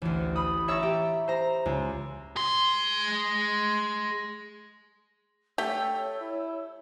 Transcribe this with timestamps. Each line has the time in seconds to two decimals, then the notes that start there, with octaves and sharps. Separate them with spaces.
0.02 A1 D2
0.36 B5 D#6
0.68 C#5 E5 A#5 C#6 E6 A6
0.83 G4
1.28 C5 A#5
1.66 C#2
2.36 G#4 C6
5.58 A3 G4 C#5 G5 E6
6.21 E4